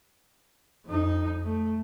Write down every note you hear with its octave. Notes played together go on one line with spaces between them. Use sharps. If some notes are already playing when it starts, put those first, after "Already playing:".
F2 D#4
A3